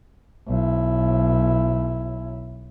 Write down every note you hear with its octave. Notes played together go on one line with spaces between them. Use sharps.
B1 E4